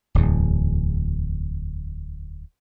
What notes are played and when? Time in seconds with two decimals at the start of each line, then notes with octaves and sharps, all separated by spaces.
0.15 D1 E2